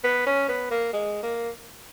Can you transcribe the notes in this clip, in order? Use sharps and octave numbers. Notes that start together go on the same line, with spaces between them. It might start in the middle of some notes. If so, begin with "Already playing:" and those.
B3
C#4
B3
A#3
G#3
A#3